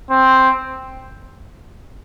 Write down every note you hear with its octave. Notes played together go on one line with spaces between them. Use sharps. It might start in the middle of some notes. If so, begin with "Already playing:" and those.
C4